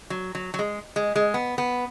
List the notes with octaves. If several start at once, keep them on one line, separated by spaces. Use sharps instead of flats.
F#3
F#3
F#3
G#3
G#3
G#3
B3
B3